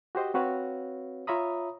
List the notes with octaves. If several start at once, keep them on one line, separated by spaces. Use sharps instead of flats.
F#4 G4 C5 D#5
C4 F#4 B4 C#5 F5
F4 C#5 E5 A#5 B5 D#6